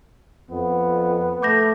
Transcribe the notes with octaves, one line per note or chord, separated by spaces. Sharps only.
F2 B3
A3 D6 G6 A#6